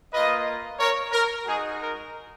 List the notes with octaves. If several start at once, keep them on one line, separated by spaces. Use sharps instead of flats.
A#3 F4 B4 D#5
A#4 C#5
A#4
G#3 D#4 F#4 G#4
A#4